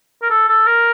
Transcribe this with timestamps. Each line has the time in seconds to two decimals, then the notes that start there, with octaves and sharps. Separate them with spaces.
0.23 A#4
0.30 A4
0.49 A4
0.67 A#4